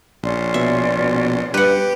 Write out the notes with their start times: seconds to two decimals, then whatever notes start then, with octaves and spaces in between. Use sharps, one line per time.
0.23 A#1 C#4 D5 C6
0.54 B2 E5
0.98 B2
1.54 G2 G4 B4 F#5